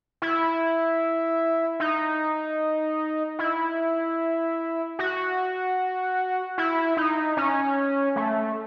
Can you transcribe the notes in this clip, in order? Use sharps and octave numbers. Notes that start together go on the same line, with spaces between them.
E4
D#4
E4
F#4
E4
D#4
C#4
A3